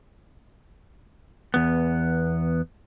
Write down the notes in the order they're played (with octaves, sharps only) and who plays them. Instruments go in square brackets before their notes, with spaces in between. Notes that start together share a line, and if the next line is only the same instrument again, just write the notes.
[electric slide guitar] E2 B3